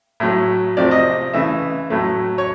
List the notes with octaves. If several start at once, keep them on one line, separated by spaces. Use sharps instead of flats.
A2 F#3 A3
C3 F3 A3 D5
D#5
C#3 E3 A3 E5
A2 F#3 A3
C#5